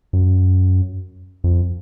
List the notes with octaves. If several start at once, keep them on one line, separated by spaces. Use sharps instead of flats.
F#2
F2